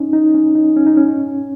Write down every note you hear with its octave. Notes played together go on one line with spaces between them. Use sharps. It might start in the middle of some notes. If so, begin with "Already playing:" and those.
Already playing: C#4 D#4
D#4
C#4
D#4
C#4
D#4
C#4